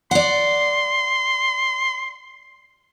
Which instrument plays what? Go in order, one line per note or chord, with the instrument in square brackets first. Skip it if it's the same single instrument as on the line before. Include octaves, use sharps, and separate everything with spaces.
[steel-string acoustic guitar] D5 F#5 [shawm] C6